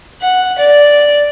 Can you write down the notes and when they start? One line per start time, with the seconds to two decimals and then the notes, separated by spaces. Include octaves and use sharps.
0.22 F#5
0.58 D5